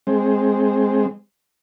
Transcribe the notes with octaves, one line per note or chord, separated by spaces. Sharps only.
G#3 C4